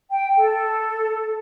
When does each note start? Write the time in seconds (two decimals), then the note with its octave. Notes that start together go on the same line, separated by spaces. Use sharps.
0.10 G5
0.37 A4